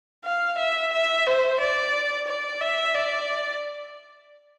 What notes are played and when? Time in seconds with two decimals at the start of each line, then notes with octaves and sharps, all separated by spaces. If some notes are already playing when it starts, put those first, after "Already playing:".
0.25 F5
0.58 E5
0.93 E5
1.27 C5
1.60 D5
2.28 D5
2.61 E5
2.95 D5